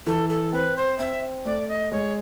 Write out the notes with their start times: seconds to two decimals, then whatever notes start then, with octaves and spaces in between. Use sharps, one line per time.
0.07 E3 A4
0.29 A4
0.53 C4 B4
0.76 C5
0.99 C4 E5
1.45 A3 D5
1.69 D#5
1.92 G#3 C#5